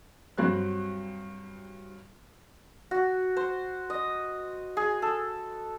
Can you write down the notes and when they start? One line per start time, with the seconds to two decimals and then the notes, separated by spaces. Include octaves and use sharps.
0.38 G2 F#3 C4 B5 F#6
2.91 F#4
3.37 C5
3.90 D#5
4.77 G#4
5.02 A4